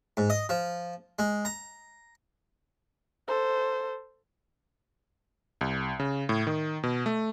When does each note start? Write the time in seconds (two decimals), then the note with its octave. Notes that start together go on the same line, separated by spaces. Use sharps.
0.17 G#2
0.30 D#5
0.49 F3
1.19 G#3
1.45 A#5
3.28 A4 C5
5.61 C2
6.00 C#3
6.29 A2
6.47 D#3
6.83 B2
7.06 A3